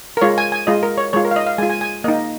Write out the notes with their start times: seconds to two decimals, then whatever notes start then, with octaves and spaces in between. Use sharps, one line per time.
0.17 A#4
0.21 G#3 F4 C#5
0.38 G#5
0.52 G#5
0.67 G#3 F4 D#5
0.83 A#4
0.98 C#5
1.13 G#3 F4 C#5
1.25 A#4
1.31 F5
1.36 D#5
1.47 F5
1.58 G#3 F4 G#5
1.70 G#5
1.81 G#5
2.04 A#3 D#4 D#5